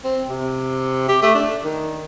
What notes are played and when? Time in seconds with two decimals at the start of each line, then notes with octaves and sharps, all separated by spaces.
0.04 C4
0.29 C3
1.08 G4
1.22 A3
1.35 D4
1.64 D#3